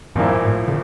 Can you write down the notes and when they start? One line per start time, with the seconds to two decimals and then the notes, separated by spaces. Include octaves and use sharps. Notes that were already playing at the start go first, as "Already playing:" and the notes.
0.15 A#1 G2 A#2 F3 A#3 E4
0.44 A2
0.68 D3